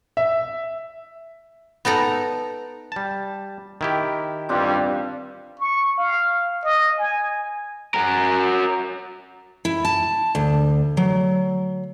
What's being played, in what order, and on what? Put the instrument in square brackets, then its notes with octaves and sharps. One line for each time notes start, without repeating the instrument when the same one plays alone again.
[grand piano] E5
[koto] B3 D#4 A4 A#5
[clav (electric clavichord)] G3 A5
D#3 E4 G4
[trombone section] A1 G2 G3 [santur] C4 D4 F4
[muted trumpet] C#6
F5
D#5
G#5
[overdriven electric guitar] F#4 A#4
[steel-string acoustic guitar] E4
A5
D2
F#3